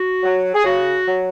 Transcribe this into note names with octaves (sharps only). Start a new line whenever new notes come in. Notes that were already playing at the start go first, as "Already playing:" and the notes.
Already playing: F#4
F#3
G#4
C#3 F#4
F#3